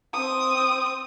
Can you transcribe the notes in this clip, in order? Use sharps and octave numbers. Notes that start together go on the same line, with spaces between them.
C4 D#6